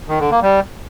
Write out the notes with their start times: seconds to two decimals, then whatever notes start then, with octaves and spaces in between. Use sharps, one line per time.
0.08 D#3
0.19 D3
0.31 A#3
0.42 G3